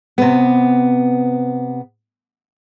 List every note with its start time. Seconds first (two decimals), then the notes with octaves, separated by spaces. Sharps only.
0.18 C3 B3